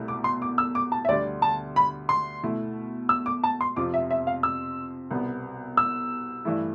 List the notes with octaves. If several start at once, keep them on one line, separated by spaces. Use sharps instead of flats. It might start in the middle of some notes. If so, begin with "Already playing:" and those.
Already playing: C2 B2 A3 E4
D6
C6
D6
E6
D6
A5
E5
D2 D3 G3 D5
A5
B5
C6
B2 A3 E4
E6
D6
A5
C6
F2 C3 F3 C4 F4 D6
E5
E5
F5
E6
C2 B2 B3
E6
G2 E3 A3 E4